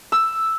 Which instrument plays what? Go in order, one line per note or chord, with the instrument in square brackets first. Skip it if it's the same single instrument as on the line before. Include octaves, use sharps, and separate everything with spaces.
[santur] E6